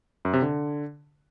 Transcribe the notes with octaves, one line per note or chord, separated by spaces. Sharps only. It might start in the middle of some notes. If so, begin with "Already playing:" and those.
F#2
C3
D3